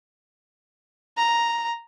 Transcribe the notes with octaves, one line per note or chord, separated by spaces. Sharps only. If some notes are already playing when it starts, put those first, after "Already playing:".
A#5